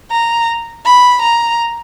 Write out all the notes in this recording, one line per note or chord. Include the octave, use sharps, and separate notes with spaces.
A#5
B5
A#5